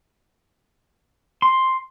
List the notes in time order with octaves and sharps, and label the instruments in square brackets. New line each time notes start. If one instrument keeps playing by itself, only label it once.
[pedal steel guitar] C6